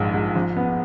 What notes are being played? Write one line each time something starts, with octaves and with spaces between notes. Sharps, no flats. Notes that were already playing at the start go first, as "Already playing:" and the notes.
Already playing: A#1 G#2 F3
G#2
F3
B3